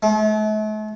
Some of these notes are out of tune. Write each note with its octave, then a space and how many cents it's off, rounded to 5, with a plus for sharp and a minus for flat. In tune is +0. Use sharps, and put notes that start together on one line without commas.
A3 -45